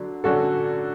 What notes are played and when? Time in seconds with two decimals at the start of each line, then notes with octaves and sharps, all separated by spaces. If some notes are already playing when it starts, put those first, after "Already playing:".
Already playing: D3 F#3
0.24 D3 F#3 C#4 F#4 A4